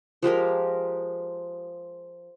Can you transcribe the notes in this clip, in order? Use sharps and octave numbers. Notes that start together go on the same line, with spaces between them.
F3 G#3 G4 A#4